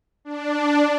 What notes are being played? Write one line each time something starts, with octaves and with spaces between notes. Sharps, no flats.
D4